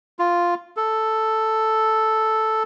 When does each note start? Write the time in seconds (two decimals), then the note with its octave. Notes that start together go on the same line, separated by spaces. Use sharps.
0.19 F4
0.76 A4